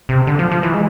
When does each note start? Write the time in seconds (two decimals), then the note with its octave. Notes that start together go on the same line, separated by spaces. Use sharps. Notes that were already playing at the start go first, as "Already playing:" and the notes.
0.09 C3
0.27 D3
0.39 F3
0.52 F3
0.63 E3
0.74 G#3